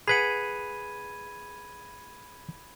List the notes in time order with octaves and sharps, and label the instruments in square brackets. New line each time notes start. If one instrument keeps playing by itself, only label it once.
[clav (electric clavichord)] G#4 B4 F#5 [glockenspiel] B5 G#6 D#7